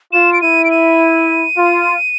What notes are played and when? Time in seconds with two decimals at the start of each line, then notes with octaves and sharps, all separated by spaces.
0.13 F4 E7
0.33 D7
0.41 E4 D#7
0.65 D7
0.71 D#7
1.57 F4